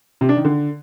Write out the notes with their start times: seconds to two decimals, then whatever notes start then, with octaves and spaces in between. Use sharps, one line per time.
0.21 C3
0.29 D4
0.37 D#3
0.45 D3